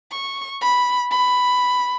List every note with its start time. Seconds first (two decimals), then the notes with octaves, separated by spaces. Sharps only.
0.12 C#6
0.61 B5
1.11 B5